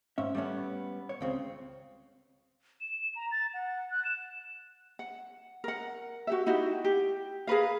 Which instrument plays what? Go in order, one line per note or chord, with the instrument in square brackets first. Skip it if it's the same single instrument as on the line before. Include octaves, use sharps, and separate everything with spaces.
[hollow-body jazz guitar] G#2 C#4 E5
G3 A3 B3 C#4
C#5
C#2 C#3 C4
[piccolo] E7
A#5
A6
F#5
F#6
E7
[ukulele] F#5
A#4 F#5
F#4 G4 E5
D#4 E4 F#4 G4
G4
G#4 A#4 B4 F5